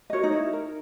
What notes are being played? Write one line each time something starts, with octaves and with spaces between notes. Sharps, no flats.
D#5
F#4 A#4 C#5
D#4 D#5
E4
A#4